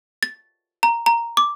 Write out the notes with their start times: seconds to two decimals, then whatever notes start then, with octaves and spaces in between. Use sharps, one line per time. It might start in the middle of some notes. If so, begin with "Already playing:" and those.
0.23 A6
0.83 A#5
1.06 A#5
1.37 D6